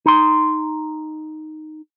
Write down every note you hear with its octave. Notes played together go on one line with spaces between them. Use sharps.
D#4 C6